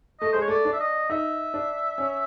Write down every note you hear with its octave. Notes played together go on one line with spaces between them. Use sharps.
A3 D#5
G#3 C5
C#5
A3 D5
D4
E5
D#5
D#4 E5
D4
C#4